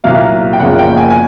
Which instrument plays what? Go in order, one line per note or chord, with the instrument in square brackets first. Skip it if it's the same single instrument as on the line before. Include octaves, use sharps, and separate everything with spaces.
[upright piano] C2 A#2 F#3 A#3 F5
G5
F#1 F#2 C#3 F3 A#3 F#5
G5
G5
G#5
G#5